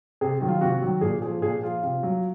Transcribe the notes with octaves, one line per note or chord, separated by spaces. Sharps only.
C3 G#4
D#3 F#3
F4
C3 F#4
D#3 F#3
A#2 G#4
F3 G#4
A#2 G#4
F3 F4
C3 F4
F#3